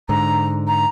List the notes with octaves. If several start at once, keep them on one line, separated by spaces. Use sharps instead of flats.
G#2 D3 A#5
A#5